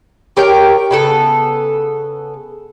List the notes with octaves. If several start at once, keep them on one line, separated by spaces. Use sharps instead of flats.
G4 A#4 C#5 G5
C#3 B3 A4